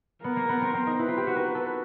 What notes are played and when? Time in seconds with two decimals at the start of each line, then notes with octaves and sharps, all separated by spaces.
0.24 B3 A#4
0.36 A#3
0.49 B3
0.61 C4
0.74 C4
0.87 D#4
0.99 E4 B4
1.08 F4
1.18 G4
1.27 F#4
1.36 A#4
1.55 A4